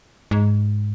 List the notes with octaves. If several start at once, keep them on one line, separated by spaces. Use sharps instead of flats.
G#2